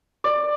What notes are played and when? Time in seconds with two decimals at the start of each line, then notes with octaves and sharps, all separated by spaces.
0.24 D5